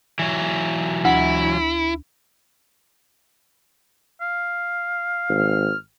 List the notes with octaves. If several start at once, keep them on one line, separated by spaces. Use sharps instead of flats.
E3 F#3
D2 E4
F5
G#1 F6